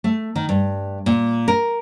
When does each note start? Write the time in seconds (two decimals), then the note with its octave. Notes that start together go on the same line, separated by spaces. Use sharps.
0.04 A3
0.36 D#3
0.49 G2
1.06 A#2
1.48 A#4